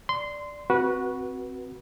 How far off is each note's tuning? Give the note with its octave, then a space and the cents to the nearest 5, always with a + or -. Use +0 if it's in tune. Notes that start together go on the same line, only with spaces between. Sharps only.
D5 +0 C6 -15
C4 +0 F#4 +0 B4 -25